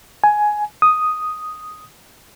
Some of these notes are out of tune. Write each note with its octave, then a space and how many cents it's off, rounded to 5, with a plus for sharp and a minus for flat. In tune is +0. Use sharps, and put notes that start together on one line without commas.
G#5 +10
D#6 +0